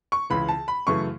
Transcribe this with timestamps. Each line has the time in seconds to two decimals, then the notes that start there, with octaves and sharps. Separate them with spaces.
0.12 C#6
0.30 C#2 C#3 E3 B5
0.48 A5
0.68 B5
0.87 F#2 C#3 E3 A3 C#6